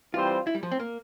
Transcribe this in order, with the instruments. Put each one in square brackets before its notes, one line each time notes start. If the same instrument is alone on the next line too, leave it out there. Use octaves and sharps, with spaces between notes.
[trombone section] E3 G3 C4 G4 C5 [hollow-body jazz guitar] F4
[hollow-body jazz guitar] E4
G3
F3
C4
A#3